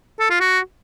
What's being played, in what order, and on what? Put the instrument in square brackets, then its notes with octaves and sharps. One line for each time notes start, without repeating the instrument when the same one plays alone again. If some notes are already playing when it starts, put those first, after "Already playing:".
[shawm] A4
F4
F#4